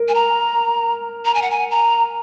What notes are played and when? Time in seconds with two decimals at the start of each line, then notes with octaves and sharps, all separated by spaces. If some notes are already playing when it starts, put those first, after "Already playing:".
Already playing: A#4
0.09 G#5
0.14 A#5
1.25 A#5
1.35 G#5
1.42 F#5
1.51 G#5
1.71 A#5